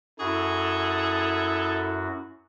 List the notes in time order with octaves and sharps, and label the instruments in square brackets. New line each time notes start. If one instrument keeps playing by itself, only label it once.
[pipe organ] F#2 F#4 [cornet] E4 [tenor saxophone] G#4 [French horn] A4